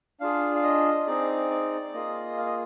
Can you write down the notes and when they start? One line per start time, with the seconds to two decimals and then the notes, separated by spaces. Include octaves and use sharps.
0.20 D4 F4 G#4 F5
0.55 F5
0.63 D#5
1.07 C4 D#4 G#4 D5
1.50 D5
1.94 A#3 F4 G#4 D#5
2.37 F5
2.46 D#5